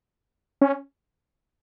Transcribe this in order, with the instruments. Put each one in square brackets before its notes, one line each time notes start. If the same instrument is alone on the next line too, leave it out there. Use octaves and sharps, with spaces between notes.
[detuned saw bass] C#4